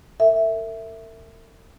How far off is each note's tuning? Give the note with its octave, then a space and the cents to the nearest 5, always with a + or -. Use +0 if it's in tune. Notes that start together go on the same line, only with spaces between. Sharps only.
A#4 -45 E5 +0